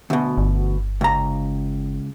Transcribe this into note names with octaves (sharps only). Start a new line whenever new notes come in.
D2 B2
G1
C#2 A#5